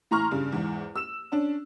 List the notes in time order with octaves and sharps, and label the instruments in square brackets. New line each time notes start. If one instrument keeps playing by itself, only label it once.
[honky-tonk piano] A2 E3 A#5 C6 C#6 F6
G2 C#3
E2 G#2
E6 E7
C#4 D4